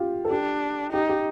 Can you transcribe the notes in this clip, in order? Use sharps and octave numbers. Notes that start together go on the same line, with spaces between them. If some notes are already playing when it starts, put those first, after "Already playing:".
Already playing: F4 G4
A4
D4 G4
D#4 G4
G4